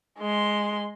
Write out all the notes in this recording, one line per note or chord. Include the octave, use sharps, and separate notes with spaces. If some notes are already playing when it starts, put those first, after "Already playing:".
G#3 C6